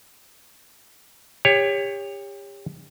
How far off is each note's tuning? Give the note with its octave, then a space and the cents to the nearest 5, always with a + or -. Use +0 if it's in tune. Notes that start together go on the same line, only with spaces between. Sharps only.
G4 +30 C#5 +0